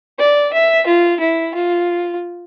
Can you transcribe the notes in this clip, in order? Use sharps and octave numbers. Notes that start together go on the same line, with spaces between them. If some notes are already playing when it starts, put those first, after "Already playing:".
D5
E5
F4
E4
F4